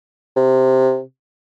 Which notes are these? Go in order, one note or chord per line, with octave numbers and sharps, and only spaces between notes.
C3